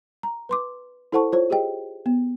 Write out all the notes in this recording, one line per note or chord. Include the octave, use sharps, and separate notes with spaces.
A#5
B4 C6 D6
E4 A4 C5 F#5 A5 C#6
F4 C5 C#5
G4 G#4 D#5 G5
B3